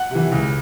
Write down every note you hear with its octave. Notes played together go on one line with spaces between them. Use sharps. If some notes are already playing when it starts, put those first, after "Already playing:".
Already playing: F#5
C3 E3
C#2